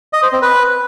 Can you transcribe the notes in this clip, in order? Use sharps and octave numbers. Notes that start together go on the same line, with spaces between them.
D#5
C5
C4
B4